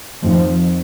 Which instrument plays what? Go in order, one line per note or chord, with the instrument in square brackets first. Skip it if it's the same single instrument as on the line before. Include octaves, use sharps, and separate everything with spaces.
[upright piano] F2 D#3 C4 [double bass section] F3